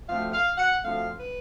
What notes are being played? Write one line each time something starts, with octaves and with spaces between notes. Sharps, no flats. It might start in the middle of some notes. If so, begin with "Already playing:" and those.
D2 D3 F3 A3 C4 F5
F5
F#5
D2 D3 F3 A3 C4 F5
B4